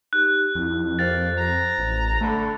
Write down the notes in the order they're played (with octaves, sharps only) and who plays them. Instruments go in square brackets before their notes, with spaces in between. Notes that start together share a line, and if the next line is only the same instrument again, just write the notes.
[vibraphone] D#4 G4 [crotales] F#6
[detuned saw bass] F2 [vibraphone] E4
[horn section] A#3 G4 F5 [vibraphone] C5 [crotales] A6
[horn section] A#5
[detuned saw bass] A1
[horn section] D3 [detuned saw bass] A3 [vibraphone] A5 B5